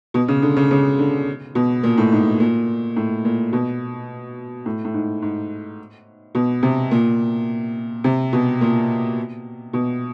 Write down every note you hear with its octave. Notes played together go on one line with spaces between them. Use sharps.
B2
C#3
D3
C#3
C#3
D3
B2
A#2
A2
G#2
A#2
A2
A#2
B2
A2
A2
G#2
G#2
B2
C3
A#2
C3
B2
A#2
B2